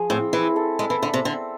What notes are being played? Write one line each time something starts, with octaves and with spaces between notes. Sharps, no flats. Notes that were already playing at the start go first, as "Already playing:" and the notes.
Already playing: F3 G#4
A2 C4
E3 E4
A4
G#3 E5
E3
D3 E5
C3
D3 C4